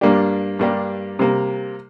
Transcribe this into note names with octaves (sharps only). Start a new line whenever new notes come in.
G2 G3 A#3 D4 G4
G2 G3 A#3 D4 G4
C3 G3 A#3